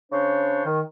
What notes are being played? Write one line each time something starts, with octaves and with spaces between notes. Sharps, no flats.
C#3 D4 C5 C#5
D#3